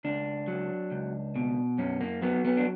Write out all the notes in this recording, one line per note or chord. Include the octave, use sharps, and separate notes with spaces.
C#2 D4
F#3
C#2
B2
F#2 C#4
A#3
F#3 B3
B3
D4